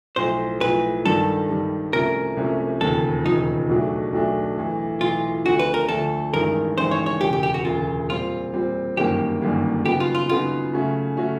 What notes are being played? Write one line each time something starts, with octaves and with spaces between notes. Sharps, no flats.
B1 A2 F3 C5
B1 A2 F3 B4
G2 D#3 G3 A4
G2 D#3 G3
C2 C3 F3 A3 C#4 A#4
C2 C3 F3 A3 C#4
E1 D#2 C#3 F3 A4
E1 D#2 C#3 F3 D#4
B1 B2 F#3 A3 D4
B1 B2 F#3 A3 D4
B1 A2 E3
B1 A2 E3 F4
D2 D3 F3 A3 F#4
B4
A#4
D2 D3 F3 A3 A4
A1 G2 D#3 G#3 A#4
A1 G2 D#3 G#3 C5
C#5
C#5
E1 D2 C#3 G4
G4
G4
F#4
E1 D2 C#3 F4
A#2 G3 C4 F4
A#2 G3 C4
G1 F#2 D#3 G3 A#3 G4
G1 F#2 D#3 G3 A#3
C#3 F#3 B3 D#4 G4
F4
F4
C#3 F#3 B3 D#4 F4
C#3 F#3 A3 C#4 F#4
C#3 F#3 A3 C#4 F#4